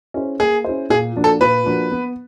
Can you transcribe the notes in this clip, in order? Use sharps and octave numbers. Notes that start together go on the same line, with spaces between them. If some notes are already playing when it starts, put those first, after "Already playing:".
C#4 E4 G#4 C5
A#3 G#4
C#4 E4 G#4 C5
A#2 G#4
F3 A#3 D4 F#4
A4
A#2 B4
F3 A#3 D4 F#4
B3